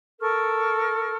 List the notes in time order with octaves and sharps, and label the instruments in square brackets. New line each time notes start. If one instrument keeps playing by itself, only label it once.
[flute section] A4 A#4 C#6 F6